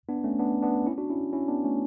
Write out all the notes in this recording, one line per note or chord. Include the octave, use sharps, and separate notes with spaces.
B3 D4
A3 C#4
B3 D4
B3 D4
C#4 E4
D4 F#4
C#4 E4
C#4 E4
B3 D4
A3 C#4